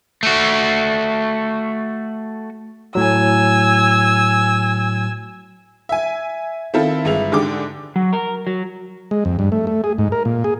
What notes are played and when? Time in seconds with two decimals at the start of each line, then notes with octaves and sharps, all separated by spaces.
0.23 A3 F#4
2.95 A2 F#3 G#5 E6
5.89 E5 G#5
6.74 D#3 C4 E4 F4 A4
7.05 G1 G#3 E5 F7
7.32 G#2 D3 G4 G#4 D6
7.96 F#3
8.13 A#4
8.47 F#3
9.11 G#3
9.25 F2
9.39 G2
9.52 A3
9.67 A3
9.84 G#4
9.98 G#2
10.12 A#4
10.25 A#2
10.44 G#4